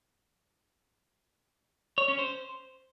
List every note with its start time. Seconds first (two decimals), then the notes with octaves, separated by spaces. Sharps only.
1.98 C#5
2.08 C#4
2.19 C5